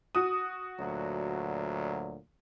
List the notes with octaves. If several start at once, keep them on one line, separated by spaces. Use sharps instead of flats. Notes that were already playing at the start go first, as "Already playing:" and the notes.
F#4 D#6
D2 A#2 F#3